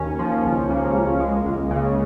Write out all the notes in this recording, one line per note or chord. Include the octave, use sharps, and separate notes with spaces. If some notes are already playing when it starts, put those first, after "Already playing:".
Already playing: D#2 D#3 C#4
F3
C#2
C#3 A#3
C#2
G#3
C#2
C#3